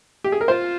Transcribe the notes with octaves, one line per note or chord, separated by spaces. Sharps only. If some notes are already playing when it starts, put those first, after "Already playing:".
G4
G#4
A#4
F4 C5